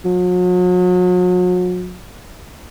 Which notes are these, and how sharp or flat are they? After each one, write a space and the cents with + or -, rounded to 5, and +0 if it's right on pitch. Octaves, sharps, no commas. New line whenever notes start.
F#3 -40